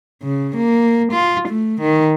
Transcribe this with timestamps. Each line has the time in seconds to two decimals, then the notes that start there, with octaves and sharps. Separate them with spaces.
0.23 C#3
0.56 A#3
1.12 F4
1.48 A3
1.81 D#3